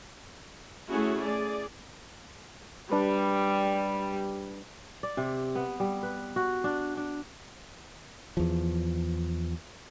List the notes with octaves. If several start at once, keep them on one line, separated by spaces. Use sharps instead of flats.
A3 C#4 E4 F#4 G#4
G#4 D5
G3 D4 B4
D5
C3
B3
G3
B4
F#4
D4
D4
E2 F3